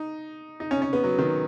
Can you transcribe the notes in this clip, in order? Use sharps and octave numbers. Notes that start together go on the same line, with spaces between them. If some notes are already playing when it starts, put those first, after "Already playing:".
Already playing: D#4
D#4
C#4
C#4
B3
F#3
D#3